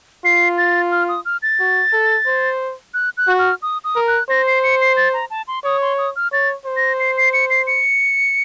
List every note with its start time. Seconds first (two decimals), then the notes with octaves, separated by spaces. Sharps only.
0.25 F4 C7
0.58 A6
0.92 F6
1.09 D#6
1.25 F6
1.43 A6
1.60 F#4
1.93 A4
2.27 C5
2.94 F#6
3.17 F#6
3.28 F#4
3.39 F6
3.62 D#6
3.84 D#6
3.96 A#4
4.08 F#6
4.30 C5 A#6
4.47 C7
4.63 C#7
4.81 C7
4.97 A6
5.13 A#5
5.30 A5
5.48 C6
5.64 C#5 D#6
5.82 C6
5.98 D#6
6.16 F6
6.32 C#5 A6
6.66 C5
6.77 A#6
7.00 C7
7.17 C7
7.33 C#7
7.50 C7
7.67 C#7